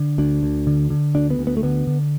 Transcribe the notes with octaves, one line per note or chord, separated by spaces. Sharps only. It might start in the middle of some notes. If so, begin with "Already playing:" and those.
Already playing: D3
D2 D4
D2
D3
D3
D2 D4
B3
D2
B3
A3
D3 B3
D3